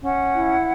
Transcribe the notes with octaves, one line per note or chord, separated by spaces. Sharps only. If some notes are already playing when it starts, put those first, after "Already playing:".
C#4 F#5
E4